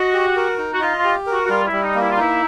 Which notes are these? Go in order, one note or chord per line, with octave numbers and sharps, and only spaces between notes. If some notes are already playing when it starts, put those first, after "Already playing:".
Already playing: F#4 D#5
G4
A#4
D#4
F#4
F4 D#5
F4
G4
A#4
F#4
F#4
G3 F4
E4
G3
D#4
A#3
E4
F4
D#4 E4